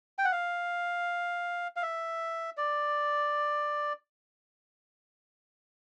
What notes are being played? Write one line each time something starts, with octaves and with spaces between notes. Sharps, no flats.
G5
F#5
F5
F5
E5
D5